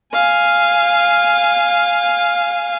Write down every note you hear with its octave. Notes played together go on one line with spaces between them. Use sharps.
F5 G#5